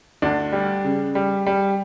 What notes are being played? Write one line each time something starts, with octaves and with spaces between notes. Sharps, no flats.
D2 D4
G3
C#3
G3
G3